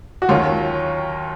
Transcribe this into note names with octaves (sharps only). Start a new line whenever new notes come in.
F#4
D#2 D#3 F#3 C#4 F4